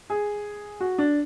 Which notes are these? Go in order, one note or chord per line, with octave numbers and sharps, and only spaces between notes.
G#4
F#4
D4